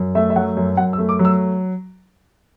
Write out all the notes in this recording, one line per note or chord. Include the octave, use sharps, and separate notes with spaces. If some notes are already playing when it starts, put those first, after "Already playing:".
Already playing: F#2
A3 E5
E5
F#3 F#5
F#2
F#2 F#5
E6
A3
D6
F#3
E6